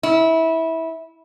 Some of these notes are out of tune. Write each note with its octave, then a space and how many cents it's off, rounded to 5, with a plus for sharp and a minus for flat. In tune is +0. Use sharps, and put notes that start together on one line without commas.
E4 -20